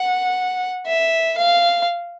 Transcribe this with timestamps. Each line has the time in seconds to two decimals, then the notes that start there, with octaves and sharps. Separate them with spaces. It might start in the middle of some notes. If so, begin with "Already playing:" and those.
Already playing: F#5
0.86 E5
1.38 F5